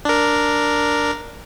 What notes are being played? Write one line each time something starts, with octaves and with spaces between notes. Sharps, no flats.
D4 A#4